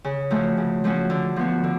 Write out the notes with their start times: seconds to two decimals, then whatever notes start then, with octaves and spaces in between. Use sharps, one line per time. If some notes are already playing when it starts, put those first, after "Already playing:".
0.04 C#3
0.30 F3 A3 C#4 F#4
0.57 C#3
0.84 F3 A3 C#4 F#4
1.10 D3
1.36 F3 B3 F#4
1.64 D3